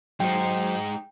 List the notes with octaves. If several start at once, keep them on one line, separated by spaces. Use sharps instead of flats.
F#3 G#3 D#4 C5 G5